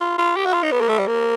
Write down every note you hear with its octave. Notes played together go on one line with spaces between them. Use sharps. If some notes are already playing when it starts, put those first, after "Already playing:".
F4
F4
G4
F#4
F4
D#4
B3
A#3
A3
G3
A#3